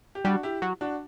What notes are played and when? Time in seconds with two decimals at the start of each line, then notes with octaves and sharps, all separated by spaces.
0.15 G4
0.24 G3 D4 F#4
0.43 E4 G4
0.62 F#3
0.81 D4 F#4